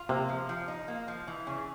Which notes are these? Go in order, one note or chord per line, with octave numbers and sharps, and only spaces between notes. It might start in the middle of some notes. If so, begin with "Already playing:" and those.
Already playing: F4
C3 A#3
F3
F3
D#4
A#3
F3
E3
C#3